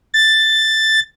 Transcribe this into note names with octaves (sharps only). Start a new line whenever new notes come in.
A6